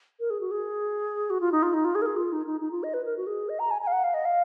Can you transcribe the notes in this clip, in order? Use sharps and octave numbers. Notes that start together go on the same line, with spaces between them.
A#4
G#4
F#4
G#4
F#4
F4
D#4
F4
D#4
F4
G#4
A#4
G#4
F4
D#4
D#4
D#4
F4
D#5
B4
A#4
F#4
G#4
D#5
A#5
G#5
G#5
F5
F#5
F5
D#5
F5